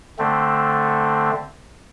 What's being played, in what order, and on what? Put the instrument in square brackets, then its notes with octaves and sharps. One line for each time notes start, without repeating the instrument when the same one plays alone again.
[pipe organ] D3 A3 C4